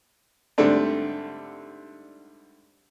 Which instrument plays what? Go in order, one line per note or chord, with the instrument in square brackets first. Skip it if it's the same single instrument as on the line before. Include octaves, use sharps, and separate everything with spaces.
[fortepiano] G#2 D3 G3 A3 C4 D4